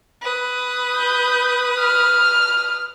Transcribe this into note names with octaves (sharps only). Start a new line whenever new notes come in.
B4 D#6
G6
F6